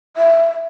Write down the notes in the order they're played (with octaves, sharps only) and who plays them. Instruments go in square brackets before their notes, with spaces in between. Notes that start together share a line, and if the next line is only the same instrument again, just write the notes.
[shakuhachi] E5